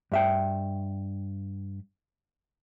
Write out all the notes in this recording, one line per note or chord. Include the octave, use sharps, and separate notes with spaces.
G2 E5 G5